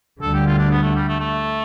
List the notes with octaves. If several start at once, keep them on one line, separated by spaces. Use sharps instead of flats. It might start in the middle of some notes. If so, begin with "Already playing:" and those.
D2 D3 G3 A4
G4
F4
D4
B3
A3
G3
A3
A3